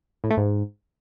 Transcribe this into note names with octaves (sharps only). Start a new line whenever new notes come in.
A2
A3
G#2